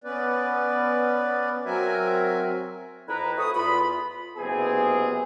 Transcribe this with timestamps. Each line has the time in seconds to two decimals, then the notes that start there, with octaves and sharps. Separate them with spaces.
0.04 B3 C#4 B4 D5
1.66 F#3 C4 F#4 A#4 E5 G#5
3.08 F2 E4 B4 A#5
3.37 A3 F#4 B4 D#6
3.55 E2 F4 B5
4.37 F#1 C3 B3 C4 G#4